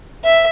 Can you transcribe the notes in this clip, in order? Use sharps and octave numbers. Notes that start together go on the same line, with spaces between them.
E5